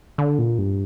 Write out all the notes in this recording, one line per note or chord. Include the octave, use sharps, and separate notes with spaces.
D3
A#2
G2